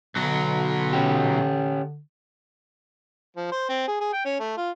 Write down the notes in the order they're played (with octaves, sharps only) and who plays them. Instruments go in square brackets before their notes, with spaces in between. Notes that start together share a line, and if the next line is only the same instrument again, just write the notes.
[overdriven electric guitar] B1 F#3 [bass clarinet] D3
[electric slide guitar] C#4 G4
[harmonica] F3
C5
C4
G#4
G#4
G5
C#4
A3
F4